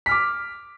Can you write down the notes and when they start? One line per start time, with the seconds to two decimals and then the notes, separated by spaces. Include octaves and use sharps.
0.06 B6
0.09 F6
0.11 D6